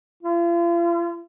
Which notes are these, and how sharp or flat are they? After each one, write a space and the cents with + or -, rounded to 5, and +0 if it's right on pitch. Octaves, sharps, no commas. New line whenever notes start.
F4 -40